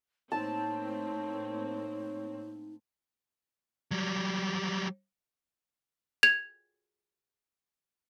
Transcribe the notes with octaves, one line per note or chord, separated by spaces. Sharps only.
A2 A#3 C4 D#4 C#5 A5
F#3 G3
G#6 F7